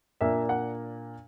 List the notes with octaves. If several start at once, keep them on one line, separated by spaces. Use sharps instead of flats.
A#2 A#3 D4 E5
F#5